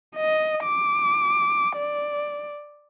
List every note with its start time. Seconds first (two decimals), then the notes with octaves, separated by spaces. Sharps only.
0.16 D#5
0.63 D6
1.76 D5